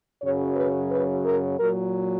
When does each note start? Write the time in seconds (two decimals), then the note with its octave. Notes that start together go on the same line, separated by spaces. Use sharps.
0.22 F#2 C#3 F#3 C#5
0.56 B4
0.91 B4
1.26 A#4
1.59 A#2 F#3 A#4